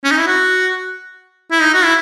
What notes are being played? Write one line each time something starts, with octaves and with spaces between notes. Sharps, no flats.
C#4
D#4
E4
F#4
E4
D#4
F#4
E4